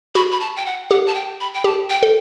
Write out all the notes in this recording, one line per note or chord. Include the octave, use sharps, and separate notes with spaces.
F#4 B5
B5
A5
G5
F#5
G4 F#5
A5
G5
B5
G5
G4 A5
G5
A4